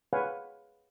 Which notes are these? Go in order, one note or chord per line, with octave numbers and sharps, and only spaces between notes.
G#4 B4 C#5 F5 F#5 G#5